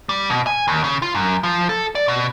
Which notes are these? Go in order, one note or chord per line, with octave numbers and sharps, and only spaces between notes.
G3
B2
G#5
D#2
C#3
F4
F#2
F3
A4
D5
B2